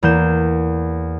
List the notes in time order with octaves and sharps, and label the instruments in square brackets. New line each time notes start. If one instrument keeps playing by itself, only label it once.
[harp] E2 A#3 G6 E7